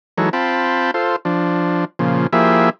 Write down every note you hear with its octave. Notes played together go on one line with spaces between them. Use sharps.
E3 F#3 G#3 D#4 A4 C#5
C4 F4 G5 A5 B5
F4 A4 C5
F3 D4
A#2 C#3 F3
F3 A#3 E4 G4 G#4 E5